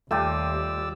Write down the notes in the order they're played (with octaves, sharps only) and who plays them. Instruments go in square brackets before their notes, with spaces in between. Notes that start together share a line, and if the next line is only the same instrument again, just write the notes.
[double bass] D#2 [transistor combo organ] G3 D5 E6 [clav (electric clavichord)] A3 [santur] F4 G4 D#5